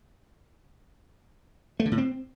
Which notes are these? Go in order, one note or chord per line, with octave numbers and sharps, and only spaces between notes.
A3
D3
A2
C4